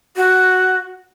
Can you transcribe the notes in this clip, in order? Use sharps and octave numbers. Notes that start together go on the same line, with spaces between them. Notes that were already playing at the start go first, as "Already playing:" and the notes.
F#4